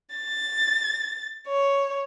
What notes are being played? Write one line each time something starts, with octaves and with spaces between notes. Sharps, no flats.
A6
C#5